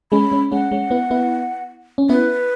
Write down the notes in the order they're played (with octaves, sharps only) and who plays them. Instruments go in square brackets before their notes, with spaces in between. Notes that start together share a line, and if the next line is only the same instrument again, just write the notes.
[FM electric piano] G#3 C#4 [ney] B5
[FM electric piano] G#3 C#4
[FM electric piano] G#3 C#4 [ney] F#5
[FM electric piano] G#3 C#4
B3 E4
B3 E4
C#4
[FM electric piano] B3 E4 [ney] B4